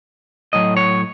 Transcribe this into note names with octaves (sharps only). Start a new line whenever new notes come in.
A2 F#3 D#5
C#5